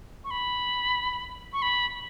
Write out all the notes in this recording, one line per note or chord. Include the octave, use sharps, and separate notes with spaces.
C#6
B5
C#6
B5